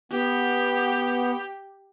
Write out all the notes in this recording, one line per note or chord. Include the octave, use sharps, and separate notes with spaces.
B3 G4